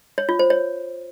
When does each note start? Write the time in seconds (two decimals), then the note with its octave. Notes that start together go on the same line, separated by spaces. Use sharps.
0.18 C#5
0.29 F4
0.39 C5
0.50 C#5